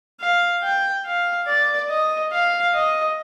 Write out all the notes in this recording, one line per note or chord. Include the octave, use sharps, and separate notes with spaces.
F5
G5
F5
D5
D#5
F5
D#5